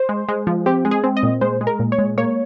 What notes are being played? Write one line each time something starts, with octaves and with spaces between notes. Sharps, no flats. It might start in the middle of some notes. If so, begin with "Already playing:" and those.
Already playing: C5
G#3
G#3
F3
C4 G4
G#3
G#4
C4
D#5
A#2
G#3 C5
G#3
A#4
A#2
C#5
G#3
A#3 C#5